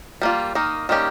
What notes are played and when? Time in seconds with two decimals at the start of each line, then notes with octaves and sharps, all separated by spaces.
0.22 G3 A#3 F4
0.55 D#3 A#3 D#4
0.89 D#3 G3 A#3 C#4 G4